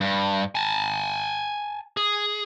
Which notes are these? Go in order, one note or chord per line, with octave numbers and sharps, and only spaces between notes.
G2
G#5 A5
G#4